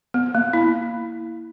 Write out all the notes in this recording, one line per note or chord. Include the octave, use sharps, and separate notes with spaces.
B3
A#3
E4